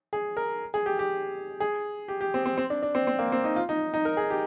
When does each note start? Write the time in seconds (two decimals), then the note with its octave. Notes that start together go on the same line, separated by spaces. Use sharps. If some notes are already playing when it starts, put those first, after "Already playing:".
0.13 G#4
0.37 A#4
0.74 G#4
0.86 G4
0.99 G4
1.60 G#4
2.08 G4
2.21 G4
2.34 C4
2.46 C4
2.58 C4
2.70 D4
2.83 D4
2.95 C4
3.07 C4
3.19 A#3
3.32 C4
3.44 D#4
3.56 F4
3.69 D#4
3.94 D#4
4.05 A#4
4.17 G#4
4.30 G4